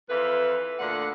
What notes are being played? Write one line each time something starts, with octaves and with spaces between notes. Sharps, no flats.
F2 E3 F4 B4
D2 A#2 D3 F#5